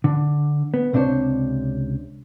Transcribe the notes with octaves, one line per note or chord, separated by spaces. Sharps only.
D3
B3
C#2 C3 D4 D#4 C5 C#5